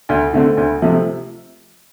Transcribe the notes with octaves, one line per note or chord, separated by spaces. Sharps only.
D2
D3 A3 C4
D2
C3 F3 A3